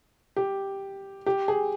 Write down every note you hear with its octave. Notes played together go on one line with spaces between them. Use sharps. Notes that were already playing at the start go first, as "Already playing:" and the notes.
G4
G4
G#4